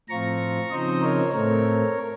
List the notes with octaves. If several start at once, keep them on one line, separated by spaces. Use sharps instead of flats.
A2 F3 C4 F4 A#5 C#6
C#3 F3 C4 D#4 C5 D#5
A#4 C#5
A2 A3 C4 A#4 C#5